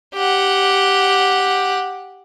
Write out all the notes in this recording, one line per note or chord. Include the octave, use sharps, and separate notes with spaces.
G4 F#5